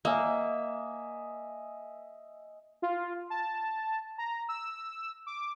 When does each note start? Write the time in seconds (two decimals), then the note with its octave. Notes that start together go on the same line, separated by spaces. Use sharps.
0.05 A#3 D#5 E5 G#5
2.82 F4
3.30 A5
4.18 A#5
4.49 E6
5.27 D6